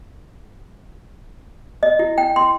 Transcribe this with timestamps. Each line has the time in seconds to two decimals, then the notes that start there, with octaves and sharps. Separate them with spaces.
1.83 D#5
1.99 E4
2.18 G5
2.36 C6